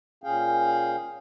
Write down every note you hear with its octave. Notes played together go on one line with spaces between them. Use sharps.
A#2 C#4 G#4 F5 G5